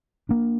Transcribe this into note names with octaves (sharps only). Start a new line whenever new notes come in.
A#3 D4